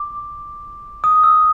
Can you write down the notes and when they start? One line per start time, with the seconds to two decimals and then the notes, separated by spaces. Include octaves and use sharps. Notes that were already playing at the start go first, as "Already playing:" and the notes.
Already playing: D6
1.04 D#6
1.24 E6